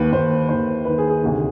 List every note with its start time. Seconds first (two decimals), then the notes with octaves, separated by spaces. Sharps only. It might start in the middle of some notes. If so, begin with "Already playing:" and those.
Already playing: D#2 D#3 B4
0.12 D#2 D#3 C5
0.49 D#2 D#3 C5
0.85 D#2 D#3 B4
0.98 G#4
1.09 G#4
1.23 D2 C3 D#3